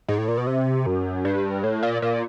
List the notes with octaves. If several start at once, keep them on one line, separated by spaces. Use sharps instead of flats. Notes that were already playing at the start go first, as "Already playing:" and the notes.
G#2
A2
A#2
B2
C3
F#2
G2
A2
A#2
A#2